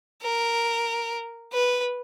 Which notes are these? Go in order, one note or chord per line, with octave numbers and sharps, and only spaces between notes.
A#4
B4